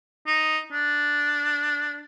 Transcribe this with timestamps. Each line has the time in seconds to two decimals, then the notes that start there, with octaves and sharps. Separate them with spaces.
0.27 D#4
0.73 D4